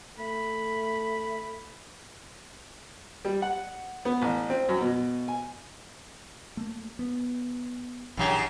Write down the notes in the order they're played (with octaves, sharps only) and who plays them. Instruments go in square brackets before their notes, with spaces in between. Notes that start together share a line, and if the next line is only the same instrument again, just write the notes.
[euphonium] A3 [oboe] B5
[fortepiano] G3
F#5
B3
A1
C4
F#2
B2
G#5
[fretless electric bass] A3 A#3
B3
[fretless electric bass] A#1 E3 D4 [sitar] F#2 C#3 G4